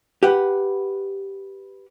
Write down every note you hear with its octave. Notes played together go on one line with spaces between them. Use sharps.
G4 B4 F#5